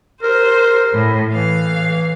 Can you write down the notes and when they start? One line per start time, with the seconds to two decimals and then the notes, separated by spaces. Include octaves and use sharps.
0.23 A#4 C5
0.91 A2
1.32 E3 F5